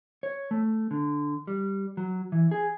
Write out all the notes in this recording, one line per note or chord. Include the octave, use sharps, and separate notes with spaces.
C#5
A3
D3
G3
F#3
E3
G#4